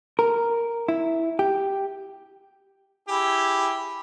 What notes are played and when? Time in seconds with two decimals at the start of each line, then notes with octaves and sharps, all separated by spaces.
0.19 A#4
0.88 E4
1.39 G4
3.09 E4 G4 G#4